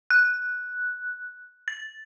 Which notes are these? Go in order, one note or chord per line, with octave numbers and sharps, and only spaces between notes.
F#6
A6